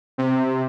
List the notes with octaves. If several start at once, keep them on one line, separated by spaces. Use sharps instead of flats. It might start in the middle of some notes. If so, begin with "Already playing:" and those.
C3